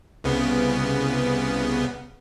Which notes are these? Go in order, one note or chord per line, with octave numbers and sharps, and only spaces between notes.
C2 C#3 B3